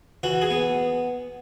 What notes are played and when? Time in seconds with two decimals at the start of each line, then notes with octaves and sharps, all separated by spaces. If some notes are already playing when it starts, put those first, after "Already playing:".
0.23 E3 F#4
0.42 G#4
0.51 B3